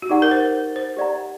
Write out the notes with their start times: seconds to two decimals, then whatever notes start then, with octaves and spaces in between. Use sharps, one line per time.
0.02 F#4
0.09 D#4 G4 D5 F#5 A#5
0.22 A#4
0.31 C5
0.76 C5
0.97 G4 D5 F#5 A#5